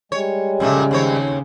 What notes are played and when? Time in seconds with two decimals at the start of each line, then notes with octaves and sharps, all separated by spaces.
0.12 G3 G#3 C#5
0.60 F2 A#2 C#3 A3
0.91 D#2 C4 C#5